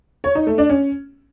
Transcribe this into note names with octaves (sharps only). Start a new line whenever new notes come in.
C#5
D#4
A3
D4
C#4